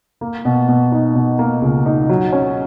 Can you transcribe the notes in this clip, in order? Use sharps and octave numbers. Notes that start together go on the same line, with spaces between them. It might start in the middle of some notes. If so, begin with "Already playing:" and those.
A#3
B2
B2
D#4
B2
A#3
C#2
D#4
F#3
C#4